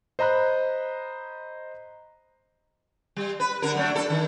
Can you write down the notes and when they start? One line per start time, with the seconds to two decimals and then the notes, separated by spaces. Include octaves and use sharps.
0.19 C5 D#5 A#5 B5 F#6
3.16 G3
3.40 B4
3.62 D3 A#4
3.75 F#3 A3 D4
3.96 A4
4.10 D#3